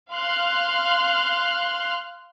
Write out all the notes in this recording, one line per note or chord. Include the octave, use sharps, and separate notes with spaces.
F5 C6 F6 F#6